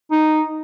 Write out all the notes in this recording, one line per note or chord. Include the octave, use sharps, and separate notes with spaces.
D#4